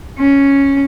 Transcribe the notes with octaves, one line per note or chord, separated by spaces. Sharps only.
C#4